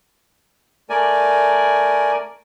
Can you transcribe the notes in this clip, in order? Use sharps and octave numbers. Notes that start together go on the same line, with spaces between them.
A3 A#4 D5 G#5